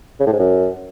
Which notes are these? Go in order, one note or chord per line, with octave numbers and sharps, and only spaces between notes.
C#3
A2
G#2
F#2